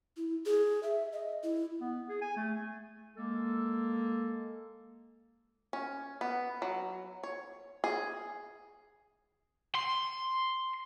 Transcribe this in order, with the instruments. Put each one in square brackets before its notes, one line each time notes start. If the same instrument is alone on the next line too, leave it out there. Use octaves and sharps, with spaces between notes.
[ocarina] E4
G#4
E5
D#5
E4
[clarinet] B3
G#4
G#5
A3
[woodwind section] G#3 A#3 A4
[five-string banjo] C#4
B3
F#3
C#5
G#4
[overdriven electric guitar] C6